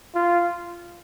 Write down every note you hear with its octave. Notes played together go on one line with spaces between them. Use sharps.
F4